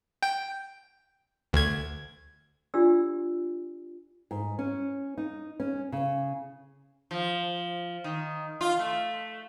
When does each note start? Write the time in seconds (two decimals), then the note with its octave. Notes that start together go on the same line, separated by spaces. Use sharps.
0.23 G5
1.53 D2 G#6
2.74 D4 F4 G4 D5 E6
4.31 G#2
4.59 C#4
5.17 D#4
5.60 C#4
5.92 C#3
7.11 F3
8.04 D#3
8.61 F4
8.79 A3